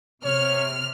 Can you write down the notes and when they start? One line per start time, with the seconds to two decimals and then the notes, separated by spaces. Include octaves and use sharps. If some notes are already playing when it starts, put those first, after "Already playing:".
0.24 C3 C#5 F6